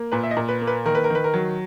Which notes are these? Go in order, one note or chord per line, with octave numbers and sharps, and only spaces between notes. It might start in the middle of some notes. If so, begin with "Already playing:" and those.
Already playing: A#3
A#2 B4
E5
D#5
A#2
B4
A#3
B4
D#3 A#4
B4
A#4
D#3 B4
A#4
F#3